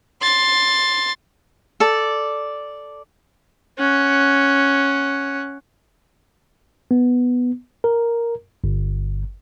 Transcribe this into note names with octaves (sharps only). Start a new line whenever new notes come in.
C6 A6
A4 D5
C#4 F#5
B3
A#4
G1